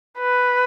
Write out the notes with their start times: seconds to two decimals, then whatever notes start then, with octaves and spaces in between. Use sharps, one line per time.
0.19 B4